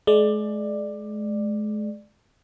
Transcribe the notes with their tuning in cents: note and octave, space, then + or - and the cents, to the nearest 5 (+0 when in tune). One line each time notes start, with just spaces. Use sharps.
G#3 +40 D5 +15